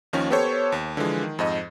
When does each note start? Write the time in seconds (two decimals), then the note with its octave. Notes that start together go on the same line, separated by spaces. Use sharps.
0.13 D#2 D#3 F3 A#3 C#4
0.30 B3 G4 A4 C5 C#5
0.72 D#2
0.97 D3 E3 F3 G#3
1.23 D#3
1.39 F2 G#2 D#5